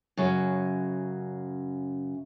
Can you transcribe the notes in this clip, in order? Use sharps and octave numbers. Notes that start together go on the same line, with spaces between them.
F#2 C#3 F#4